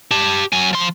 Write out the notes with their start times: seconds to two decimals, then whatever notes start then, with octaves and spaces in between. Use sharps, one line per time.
0.11 G4 A5
0.53 F#3 G#5
0.73 F3 C6